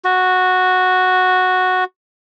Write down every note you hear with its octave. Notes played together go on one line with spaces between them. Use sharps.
F#4